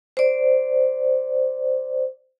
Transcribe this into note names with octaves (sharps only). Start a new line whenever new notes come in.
C5 D5